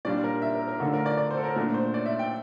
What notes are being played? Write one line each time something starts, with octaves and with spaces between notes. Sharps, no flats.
A#2 G3 D4 F4 D5
A#4
E5
A#4
A#4
D3 A3 D4 F4 A4
A#4
D5
D5
C5
A4
A#4
A#2 A3 D4 A#4
C5
D5
E5
G5